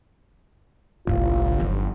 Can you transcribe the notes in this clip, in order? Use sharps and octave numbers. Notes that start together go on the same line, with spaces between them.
G1 C2 A2 F4
D#3 F#3